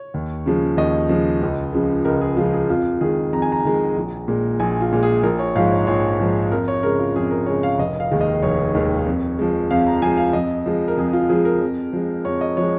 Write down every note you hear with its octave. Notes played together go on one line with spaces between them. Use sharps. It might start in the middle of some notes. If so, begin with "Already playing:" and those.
Already playing: C#5
D#2
C#3 F3 G#3
D#2 D#5
C#3 F3 G#3
C#2
C#3 F3 G#3
C#2 A#4
G#4
C#3 F3 G#3 F4
G#4
F2 F4
D#3 G#3 G#4
F2 A#5
G#5
A#5
D#3 G#3
A#1
A#2 G#3
A#1 G#5
F4
A#2 G#3
G#4
A#1 A#4
C#5
G#2 F3 G#3 F5
C#5
A#1 C#5
G#2 F3 G#3
F2 A#4
C#5
C#3 G#3 A#4
F4
F2 G#4
A#4
C#3 G#3 C#5
F5
F1 D#5
F5
D#2 D#3 G#3
D#5
F1 C#5
D#2 D#3 G#3
F2
F3 G#3
F2 F5
A#5
F3 G#3 G#5
F5
F2 D#5
F3 G#3
A#4
F2 G#4
F4
F3 G#3 G#4
A#4
F2
F3 G#3
F2 C#5
D#5
F3 G#3 C#5